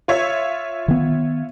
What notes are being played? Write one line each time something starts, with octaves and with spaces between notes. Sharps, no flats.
F4 C#5 E5
D#3 B3